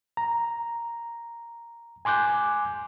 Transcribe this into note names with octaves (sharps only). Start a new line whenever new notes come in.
A#5
G#5 C6 D6 F#6 G6